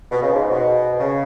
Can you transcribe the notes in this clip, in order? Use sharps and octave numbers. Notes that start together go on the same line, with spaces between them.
B2
C#3
G#2
B2
C#3